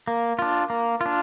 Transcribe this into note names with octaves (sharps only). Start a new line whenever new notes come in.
A#3
D4 F4
A#3
D4 F4